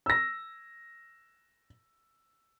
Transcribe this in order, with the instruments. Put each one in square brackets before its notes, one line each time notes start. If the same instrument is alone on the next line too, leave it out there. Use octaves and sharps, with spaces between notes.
[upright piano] E6 A#6